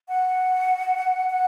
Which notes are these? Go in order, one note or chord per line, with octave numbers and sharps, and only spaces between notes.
F#5
F#5